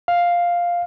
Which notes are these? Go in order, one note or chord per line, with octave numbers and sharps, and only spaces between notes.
F5